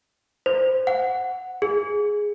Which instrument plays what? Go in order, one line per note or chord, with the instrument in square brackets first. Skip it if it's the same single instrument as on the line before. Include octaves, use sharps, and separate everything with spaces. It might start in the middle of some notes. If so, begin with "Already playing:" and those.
[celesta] C5
F#5
G#4